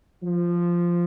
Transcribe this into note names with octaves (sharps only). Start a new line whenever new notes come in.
F3